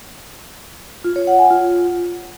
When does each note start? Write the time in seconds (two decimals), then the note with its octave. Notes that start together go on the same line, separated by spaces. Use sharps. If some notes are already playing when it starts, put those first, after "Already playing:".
1.04 F4
1.16 C#5
1.27 F#5
1.39 G#5
1.50 F4